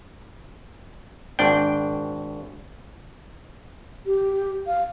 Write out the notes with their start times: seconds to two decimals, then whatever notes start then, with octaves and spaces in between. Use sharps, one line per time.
1.39 G#1 D4 G5
4.06 G4
4.67 F5